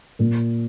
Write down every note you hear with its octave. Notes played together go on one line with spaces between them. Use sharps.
A#2